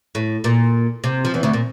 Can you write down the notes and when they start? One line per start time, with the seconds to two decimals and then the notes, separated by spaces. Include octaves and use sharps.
0.15 A2
0.44 A#2
1.04 C3
1.25 F3
1.34 E2 E3
1.43 D2 D3
1.53 A#2